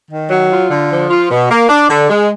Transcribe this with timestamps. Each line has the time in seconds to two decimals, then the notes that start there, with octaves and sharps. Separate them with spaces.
0.10 D#3
0.30 F#3
0.50 F4
0.69 D3
0.90 F3
1.09 F4
1.29 B2
1.49 A#3
1.69 D4
1.88 D3
2.08 G#3